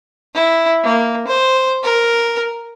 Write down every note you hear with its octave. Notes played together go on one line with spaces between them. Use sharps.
E4
A#3
C5
A#4